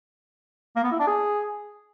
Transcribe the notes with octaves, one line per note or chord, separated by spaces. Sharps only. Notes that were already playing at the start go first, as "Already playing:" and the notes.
A#3
B3
E4
D4
G#4